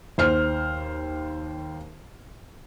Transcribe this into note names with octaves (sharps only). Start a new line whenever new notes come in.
D#2 C5 F6